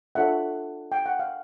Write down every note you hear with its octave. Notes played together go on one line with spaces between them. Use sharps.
D4 F4 A4 C#5 E5 F#5
G5
F#5
F5